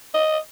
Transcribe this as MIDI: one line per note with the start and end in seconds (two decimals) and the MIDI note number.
0.14 0.38 75